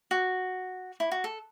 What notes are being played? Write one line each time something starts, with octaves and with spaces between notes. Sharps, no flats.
F#4
E4
F#4
A4